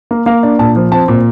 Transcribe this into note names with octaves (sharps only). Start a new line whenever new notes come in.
A#3
A#3 F5
D4
A#2 A5
F3
C4 A5
A#2